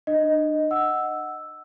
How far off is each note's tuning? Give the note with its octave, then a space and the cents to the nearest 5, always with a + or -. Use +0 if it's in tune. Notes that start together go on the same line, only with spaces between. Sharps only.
D4 +35 D#5 +0
F#5 +0 E6 +0